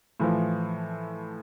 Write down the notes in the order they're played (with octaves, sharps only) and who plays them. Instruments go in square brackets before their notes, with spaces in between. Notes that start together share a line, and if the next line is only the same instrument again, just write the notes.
[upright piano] A2 E3 F3